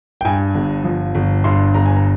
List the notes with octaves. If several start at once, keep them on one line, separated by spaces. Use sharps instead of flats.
G5
G2 G#5
G1
F3
G1
G2 C6
G1 A#5
G#5
A#5